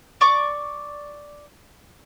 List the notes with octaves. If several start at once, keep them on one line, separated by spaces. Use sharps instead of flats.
D5 C#6 D6